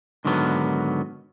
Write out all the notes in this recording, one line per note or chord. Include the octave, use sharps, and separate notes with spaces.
G#2 D3 D#3 F#3 B3